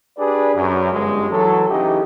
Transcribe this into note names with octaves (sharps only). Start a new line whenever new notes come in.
D4 G4 G#4 B4 D5
F#2
G1 G#3
E3 F#3 A4
C#3 E3 D#4 G4